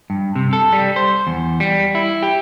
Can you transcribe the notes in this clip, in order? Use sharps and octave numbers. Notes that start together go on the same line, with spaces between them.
G2
C3
A4
G3
C5
E2
G3
E4
G4